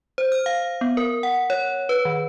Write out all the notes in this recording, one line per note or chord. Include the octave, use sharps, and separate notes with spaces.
C5
F6
F5
B3
A#4
F#5
C#5
B4
D#3